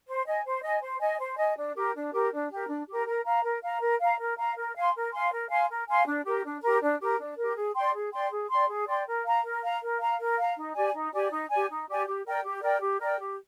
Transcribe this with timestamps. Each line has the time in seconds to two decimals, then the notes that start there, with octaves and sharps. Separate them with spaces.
0.06 C5
0.26 D#5 G#5
0.44 C5
0.62 D#5 G#5
0.81 C5
1.00 D#5 G#5
1.19 C5
1.37 D#5 G#5
1.56 D4
1.76 G4 A#4
1.94 D4
2.13 G4 A#4
2.32 D4
2.50 G4 A#4
2.68 D4
2.87 G4 A#4
3.07 A#4
3.25 F5 A#5
3.44 A#4
3.63 F5 A#5
3.81 A#4
4.00 F5 A#5
4.19 A#4
4.38 F5 A#5
4.57 A#4
4.75 F5 G#5 C6
4.94 A#4
5.12 F5 G#5 C6
5.32 A#4
5.50 F5 G#5 C6
5.69 A#4
5.88 F5 G#5 C6
6.06 D4
6.25 G4 A#4
6.44 D4
6.63 G4 A#4
6.81 D4
7.00 G4 A#4
7.19 D4
7.37 A#4
7.42 G4
7.56 G#4
7.76 D5 G5 C6
7.94 G#4
8.13 D5 G5 C6
8.31 G#4
8.50 D5 G5 C6
8.69 G#4
8.88 D5 G5 C6
9.07 A#4
9.25 F5 A#5
9.43 A#4
9.63 F5 A#5
9.82 A#4
10.00 F5 A#5
10.19 A#4
10.37 F5 A#5
10.56 D#4
10.76 G4 D5 G#5
10.93 D#4
11.13 G4 D5 G#5
11.31 D#4
11.50 G4 D5 G#5
11.69 D#4
11.88 G4 D5 G#5
12.06 G4
12.24 A#4 D5 G5
12.44 G4
12.62 A#4 D5 G5
12.81 G4
13.00 A#4 D5 G5
13.19 G4